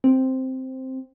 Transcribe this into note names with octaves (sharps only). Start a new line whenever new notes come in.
C4